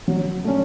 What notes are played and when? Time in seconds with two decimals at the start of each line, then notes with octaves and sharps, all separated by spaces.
0.08 F#3
0.44 A3 C#4